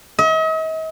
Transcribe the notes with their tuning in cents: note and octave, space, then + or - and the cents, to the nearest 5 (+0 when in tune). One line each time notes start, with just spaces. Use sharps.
D#5 +45